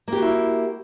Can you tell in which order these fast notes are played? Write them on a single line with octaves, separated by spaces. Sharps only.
A#3 G4 F#4 E4